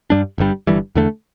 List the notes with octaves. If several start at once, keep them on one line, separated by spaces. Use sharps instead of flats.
G2 G3 D4
G1 G2 G3
G1 G2 E3 G3
E2 D3 A3